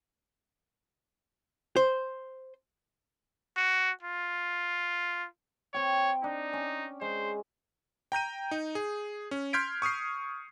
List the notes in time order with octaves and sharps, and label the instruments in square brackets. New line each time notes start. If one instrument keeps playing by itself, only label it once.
[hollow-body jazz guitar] C5
[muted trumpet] F#4
F4
[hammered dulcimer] C4 G5 [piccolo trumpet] C#5
[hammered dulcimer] D4 [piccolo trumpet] D#4
[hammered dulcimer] C#4
[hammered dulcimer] G#3 [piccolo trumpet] C5
[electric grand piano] G5 A#5 G6 D#7
D#4
G#4
C#4
C6 F6 G6 G#6 B6 D7
C#6 D#6 F6 C7